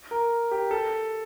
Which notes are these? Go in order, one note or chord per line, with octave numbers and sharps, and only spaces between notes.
A#4
G4
A4